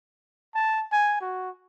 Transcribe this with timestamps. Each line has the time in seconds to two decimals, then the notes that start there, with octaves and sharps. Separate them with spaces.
0.55 A5
0.92 G#5
1.21 F#4